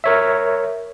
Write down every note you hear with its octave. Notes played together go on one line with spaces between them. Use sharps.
A#4 C#5 E5